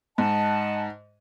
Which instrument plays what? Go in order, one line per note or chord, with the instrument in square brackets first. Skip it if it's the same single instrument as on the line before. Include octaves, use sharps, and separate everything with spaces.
[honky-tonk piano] G#2 [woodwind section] D#5 F#5 A5